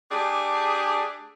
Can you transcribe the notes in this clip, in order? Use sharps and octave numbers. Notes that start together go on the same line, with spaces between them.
A3 D4 G4 G#4